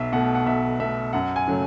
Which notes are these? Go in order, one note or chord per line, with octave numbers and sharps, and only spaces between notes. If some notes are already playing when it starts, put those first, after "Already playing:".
Already playing: B1 E5
B2 A3 F#5
F#5
B1 E5
B2 A3 E5
F#2 F#5
G#5
C#3 F#3 A3